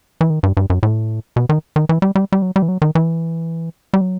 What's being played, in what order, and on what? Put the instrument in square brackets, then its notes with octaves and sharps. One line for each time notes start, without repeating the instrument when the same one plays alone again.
[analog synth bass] E3
D#3
G2
G2
F#2
A2
B2
D#3
D#3
E3
G3
G3
G3
F#3
G3
E3
F#3
D#3
E3
G3
F#3